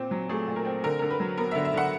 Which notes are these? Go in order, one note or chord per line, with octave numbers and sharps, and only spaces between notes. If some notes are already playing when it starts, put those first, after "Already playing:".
Already playing: A#2 C4
F#3
A3 G#4
A#2
A#4
C4
D3 A#4
D3 A#4
B4
F#3
B3 A#4
D3 E5
E5
D3 F#5